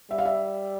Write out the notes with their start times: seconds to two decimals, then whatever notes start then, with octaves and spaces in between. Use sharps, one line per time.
0.11 G3 E5
0.18 F5
0.25 E5